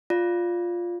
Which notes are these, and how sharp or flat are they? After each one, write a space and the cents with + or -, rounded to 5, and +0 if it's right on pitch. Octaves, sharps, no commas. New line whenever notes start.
F4 +0 D5 +0